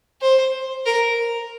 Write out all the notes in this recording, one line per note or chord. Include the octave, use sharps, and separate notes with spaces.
C5
A#4